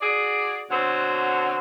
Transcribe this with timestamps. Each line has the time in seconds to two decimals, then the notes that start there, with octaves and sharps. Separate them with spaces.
0.01 F#4 G#4 D5
0.70 B2 D3 C4 C#5 F#5